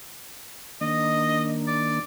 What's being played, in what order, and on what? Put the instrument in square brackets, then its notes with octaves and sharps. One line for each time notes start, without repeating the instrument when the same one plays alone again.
[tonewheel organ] D#3 A#3 D4 [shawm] D#5
[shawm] D5